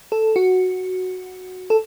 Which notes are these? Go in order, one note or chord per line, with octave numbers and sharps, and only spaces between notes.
A4
F#4
A4